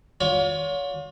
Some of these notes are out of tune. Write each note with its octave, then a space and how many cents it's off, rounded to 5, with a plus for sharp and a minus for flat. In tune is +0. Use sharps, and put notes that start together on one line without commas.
F4 +40 C#5 +35